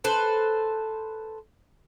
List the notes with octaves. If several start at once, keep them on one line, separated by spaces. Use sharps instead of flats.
A4 B4 C5